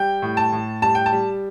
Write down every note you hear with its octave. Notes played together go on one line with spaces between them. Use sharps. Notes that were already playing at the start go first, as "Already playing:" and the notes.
Already playing: G3 G5
A2
A5
A2
G3 A5
G5
A5
G3